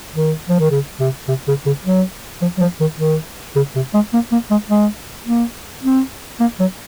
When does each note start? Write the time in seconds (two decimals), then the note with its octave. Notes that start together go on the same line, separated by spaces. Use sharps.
0.14 D#3
0.49 F3
0.60 D#3
0.71 C#3
1.00 C3
1.28 C3
1.48 C#3
1.66 C#3
1.85 F#3
2.41 F3
2.57 F#3
2.60 F3
2.80 D#3
2.98 D#3
3.56 C#3
3.75 C3
3.94 G#3
4.13 A#3
4.32 A#3
4.51 G#3
4.69 G#3
5.26 A#3
5.83 C4
6.40 A#3
6.60 F#3